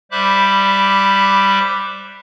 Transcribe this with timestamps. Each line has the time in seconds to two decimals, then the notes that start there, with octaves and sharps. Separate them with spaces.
0.11 G3 C5 E5 B5 D6 F#6